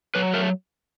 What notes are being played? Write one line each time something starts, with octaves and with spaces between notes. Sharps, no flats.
F#3 B4
A3 A#4